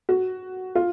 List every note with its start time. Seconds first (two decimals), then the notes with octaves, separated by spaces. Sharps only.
0.09 F#4
0.75 F4